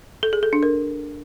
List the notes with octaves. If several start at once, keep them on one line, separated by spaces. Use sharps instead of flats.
A4
G#4
A4
D4
A#4